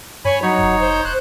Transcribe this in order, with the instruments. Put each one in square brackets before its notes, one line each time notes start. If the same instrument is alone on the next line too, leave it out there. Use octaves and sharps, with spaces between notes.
[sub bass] G2 [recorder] C#5 [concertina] G#5 B5
[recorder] F#3 [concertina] D#4 C#5
[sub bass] F1
[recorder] C5
[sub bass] E1 [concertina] F#6